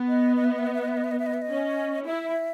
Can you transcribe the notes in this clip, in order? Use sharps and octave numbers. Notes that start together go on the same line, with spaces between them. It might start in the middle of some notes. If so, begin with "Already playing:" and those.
Already playing: B3
D#5
D#5
E5
D#5
E5
D#5
E5
D#5
E5
D#5
E5
D#5
E5
D#5
E5
D#5
C#4
E4 E5